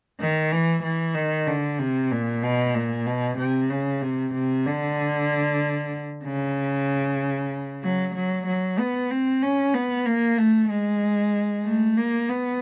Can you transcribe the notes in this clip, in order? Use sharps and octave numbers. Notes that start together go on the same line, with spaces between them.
D#3
E3
E3
D#3
D3
C3
A#2
B2
A#2
B2
C3
C#3
C3
C3
D3
C#3
F#3
F#3
F#3
B3
C4
C#4
B3
A#3
A3
G#3
A3
A#3
B3